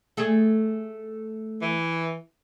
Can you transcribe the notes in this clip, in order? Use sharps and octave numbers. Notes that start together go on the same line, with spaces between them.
A3 G#4
E3